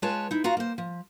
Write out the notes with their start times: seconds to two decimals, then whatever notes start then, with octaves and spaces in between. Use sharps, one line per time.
0.02 G#3 F4 B4 C#5 A5
0.31 D#4 E4
0.44 F4 F#4 F5 A#5
0.57 A#3 C5
0.78 F3